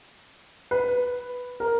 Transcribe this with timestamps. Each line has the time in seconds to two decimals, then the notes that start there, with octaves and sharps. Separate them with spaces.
0.71 B4
1.60 A#4